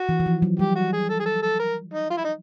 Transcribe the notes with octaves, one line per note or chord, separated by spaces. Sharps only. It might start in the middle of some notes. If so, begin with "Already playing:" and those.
Already playing: F#4
E3
E3
F3
F#3
G3 G4
F#4
G#4
A4
G#4
A4
A4
A#4
D#4
F4
E4
D#4